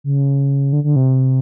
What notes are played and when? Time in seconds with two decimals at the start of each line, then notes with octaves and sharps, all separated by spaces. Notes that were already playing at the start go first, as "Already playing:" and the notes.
0.04 C#3
0.73 D3
0.84 D3
0.96 C3